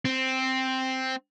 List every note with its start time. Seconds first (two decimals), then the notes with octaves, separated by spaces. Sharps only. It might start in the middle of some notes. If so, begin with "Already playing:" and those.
0.05 C4